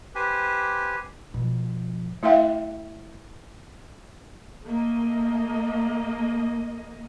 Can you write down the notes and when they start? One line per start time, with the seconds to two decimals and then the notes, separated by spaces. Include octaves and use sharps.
0.15 G4 B4 C5 G#5
1.34 B2 F3
2.23 A3 E4 E5 F5 G5
4.64 A3 A#3 D#5